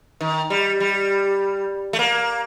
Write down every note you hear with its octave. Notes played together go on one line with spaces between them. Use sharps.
D#3
G3
G3
A3
A#3